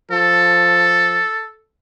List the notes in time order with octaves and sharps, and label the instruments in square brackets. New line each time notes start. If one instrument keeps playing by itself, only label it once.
[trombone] F3 [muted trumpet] A4